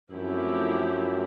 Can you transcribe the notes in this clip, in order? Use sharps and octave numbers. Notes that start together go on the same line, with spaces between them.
F#2 F3 A3 C4 E4 G4